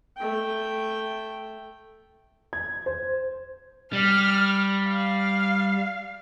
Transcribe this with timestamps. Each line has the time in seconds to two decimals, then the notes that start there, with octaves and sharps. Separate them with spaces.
0.17 A3 G5
2.53 G#6
2.86 C5
3.93 G3 F6
4.89 F5